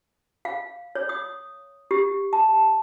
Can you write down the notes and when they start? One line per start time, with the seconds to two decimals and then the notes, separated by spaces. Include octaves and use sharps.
0.45 F5
0.95 C#5
1.09 D#6
1.91 G4
2.33 A5